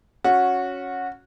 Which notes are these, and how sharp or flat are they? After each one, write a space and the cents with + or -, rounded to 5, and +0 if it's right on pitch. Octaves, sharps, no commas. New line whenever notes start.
C#4 +0 F#4 -15